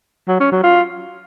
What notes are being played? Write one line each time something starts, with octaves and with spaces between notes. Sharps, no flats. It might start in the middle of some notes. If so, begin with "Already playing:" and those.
F#3
C#4
F#3
F4